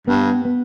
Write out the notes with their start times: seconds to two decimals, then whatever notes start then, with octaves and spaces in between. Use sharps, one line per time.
0.07 G2 B3
0.45 B3